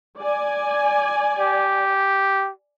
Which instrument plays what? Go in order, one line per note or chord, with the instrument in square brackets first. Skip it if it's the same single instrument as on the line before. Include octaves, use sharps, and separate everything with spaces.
[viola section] D5 G#5
[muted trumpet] G4